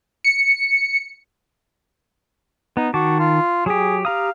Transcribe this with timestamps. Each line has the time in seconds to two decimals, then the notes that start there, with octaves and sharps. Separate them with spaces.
0.24 C#7
2.77 B3 D#4
2.94 D#3 F#4 A5 D6
3.19 F4
3.66 F#3 G4 G#4
4.05 G4 F5 A#5 D#6